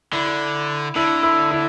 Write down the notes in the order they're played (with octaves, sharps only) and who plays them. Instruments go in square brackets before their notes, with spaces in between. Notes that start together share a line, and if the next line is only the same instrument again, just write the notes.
[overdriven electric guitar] D3 [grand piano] E4
[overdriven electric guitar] D3 [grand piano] E4
[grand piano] E4
E4